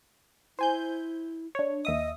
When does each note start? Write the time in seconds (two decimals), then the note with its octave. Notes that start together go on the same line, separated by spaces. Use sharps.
0.59 E4 C5 G#5 G6
1.55 D4 C#5
1.85 D#2 D#5 E5 D#6